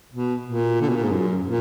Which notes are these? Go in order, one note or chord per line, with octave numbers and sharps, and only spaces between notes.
B2
A#2
D3
B2
A#2
G#2
F#2
A#2